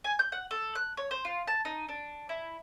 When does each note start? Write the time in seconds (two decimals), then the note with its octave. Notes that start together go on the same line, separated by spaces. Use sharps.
0.04 G#5
0.19 G6
0.32 F#5
0.51 A4
0.75 F#6
0.97 C#5
1.11 C5
1.25 F4
1.48 A5
1.65 D#4
1.89 D4
2.29 E4